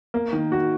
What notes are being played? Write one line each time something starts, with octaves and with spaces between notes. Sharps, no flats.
A#3
D#3
F#4